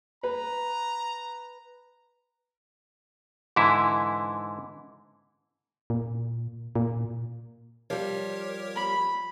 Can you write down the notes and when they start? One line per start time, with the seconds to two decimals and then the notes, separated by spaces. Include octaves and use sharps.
0.23 B4 A#5
3.56 G#2 D3 E3 E4
5.90 A#2
6.75 A#2
7.90 F3 G3 G4 A#4 C#5
8.76 B5